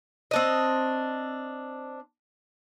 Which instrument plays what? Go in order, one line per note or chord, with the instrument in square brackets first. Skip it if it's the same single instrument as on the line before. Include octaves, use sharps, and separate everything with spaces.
[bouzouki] C4 D4 D#5